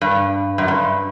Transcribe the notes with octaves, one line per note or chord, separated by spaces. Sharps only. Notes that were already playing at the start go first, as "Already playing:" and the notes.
G2
F#2
G2